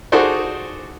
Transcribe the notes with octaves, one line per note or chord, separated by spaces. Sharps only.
D#4 F#4 G#4 A4 C5 D5